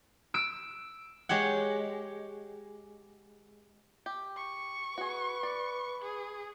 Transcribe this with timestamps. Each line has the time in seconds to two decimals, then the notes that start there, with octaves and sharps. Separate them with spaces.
0.34 E6 D7
1.29 G#3 G4 C#5 F#5
4.06 G4
4.37 C#6
4.98 F#4 G#4 B4
5.43 D5
6.02 G#4